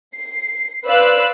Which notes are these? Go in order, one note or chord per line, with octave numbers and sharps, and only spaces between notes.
C7
B4 C5 D5 F5 E6 F#6